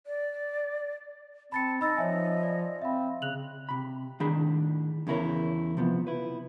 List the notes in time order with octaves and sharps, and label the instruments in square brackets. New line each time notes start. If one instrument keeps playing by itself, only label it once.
[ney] D5
[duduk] C4 [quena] A5 [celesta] B5 A6 C#7
[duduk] D#4 [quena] D#5 [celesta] B5 E6 A6
[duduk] F3 [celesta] C#5 E5 G#5
[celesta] D5
[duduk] C4 [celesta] E5 F5 B5
[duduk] C#3 [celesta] F#6 F7 F#7
[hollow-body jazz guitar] C3 B5
A2 D#3 D4 G#4 B5
E2 C#3 E4 A#4 C#5
C3 F3 B3
E4 B4